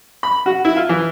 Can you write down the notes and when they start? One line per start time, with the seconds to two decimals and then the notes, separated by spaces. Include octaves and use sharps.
0.23 B5
0.46 F#4
0.65 E4
0.76 F4
0.89 E3